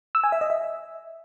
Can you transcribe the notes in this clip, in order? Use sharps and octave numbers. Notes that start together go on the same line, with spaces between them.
E6
G#5
E5
D#5
E5